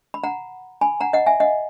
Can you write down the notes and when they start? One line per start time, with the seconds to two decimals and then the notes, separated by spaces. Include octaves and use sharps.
0.14 B5
0.24 F#5 A#5
0.81 G#5 B5
1.00 F#5 A#5
1.13 D#5 F#5
1.27 E5 G#5
1.40 D#5 F#5